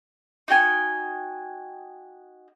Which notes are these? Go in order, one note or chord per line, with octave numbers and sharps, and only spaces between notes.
D#4 F#4 G5 G#5